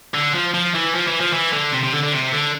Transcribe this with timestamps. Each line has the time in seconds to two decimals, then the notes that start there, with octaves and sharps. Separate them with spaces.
0.14 D3
0.35 F3
0.54 F3
0.74 E3
0.94 F3
1.07 E3
1.20 F3
1.33 E3
1.53 D3
1.73 C3
1.84 C3
1.93 D3
2.03 D3
2.13 C3
2.33 D3